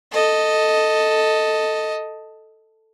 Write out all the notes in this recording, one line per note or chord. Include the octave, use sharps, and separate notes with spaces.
A4 D#5